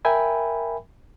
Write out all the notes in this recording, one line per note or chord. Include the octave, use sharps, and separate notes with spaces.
A#4 E5 G5 G#5 B5